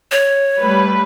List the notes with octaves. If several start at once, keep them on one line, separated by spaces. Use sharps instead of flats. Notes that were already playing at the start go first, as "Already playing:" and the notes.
C#5
G3 A3 B4